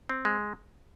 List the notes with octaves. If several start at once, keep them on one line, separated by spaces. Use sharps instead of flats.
C4
G#3